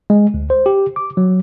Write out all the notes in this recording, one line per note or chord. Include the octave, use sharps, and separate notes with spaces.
G#3
D2
C5
G4
D6
F#3